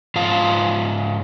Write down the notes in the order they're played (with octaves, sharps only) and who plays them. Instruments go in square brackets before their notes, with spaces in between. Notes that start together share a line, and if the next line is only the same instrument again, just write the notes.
[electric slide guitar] G#2 F4 F5 A5